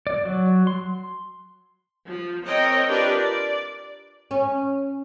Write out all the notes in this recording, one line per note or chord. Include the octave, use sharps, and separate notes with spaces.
D5
F#3
C6
F3
C4 A#4 C#5 D#5 G5
D4 F4 G4 A#4 B4 D5
D5
C#4